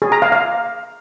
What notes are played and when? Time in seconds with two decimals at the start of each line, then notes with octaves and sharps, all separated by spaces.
0.02 G#4
0.12 A#5
0.22 F5
0.32 F5